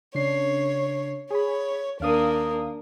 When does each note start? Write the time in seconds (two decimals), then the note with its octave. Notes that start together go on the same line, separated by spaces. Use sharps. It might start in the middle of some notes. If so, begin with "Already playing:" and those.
0.15 C#3 D4 C#5 C7
1.31 G#4 C#5 B5
2.00 D#2 A#3 D4 F5 D#6